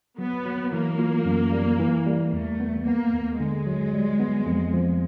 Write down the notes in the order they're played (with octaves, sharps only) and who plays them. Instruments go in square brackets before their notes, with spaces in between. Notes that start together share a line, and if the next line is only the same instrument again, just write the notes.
[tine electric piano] F#3 [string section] B3
[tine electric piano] F#3
[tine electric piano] E3 [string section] A#3
[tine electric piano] F4
F#2
G3
E3
G3
[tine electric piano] E2 [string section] A3
[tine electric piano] B3
[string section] A#3 [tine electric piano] B3
[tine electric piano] D#2
[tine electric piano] D3 [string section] G#3
[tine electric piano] F#3
G3
B3
F2
F3